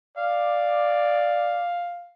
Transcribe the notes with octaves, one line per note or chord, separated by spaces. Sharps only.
D5 F5